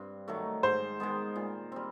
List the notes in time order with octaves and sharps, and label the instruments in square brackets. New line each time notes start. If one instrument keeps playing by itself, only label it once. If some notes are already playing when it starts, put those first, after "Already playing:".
Already playing: [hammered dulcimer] G2 C4
D#3 F#3 A3
[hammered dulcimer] G#2 [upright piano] C5
[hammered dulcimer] D#3 G#3 B3
A#2
G3 C4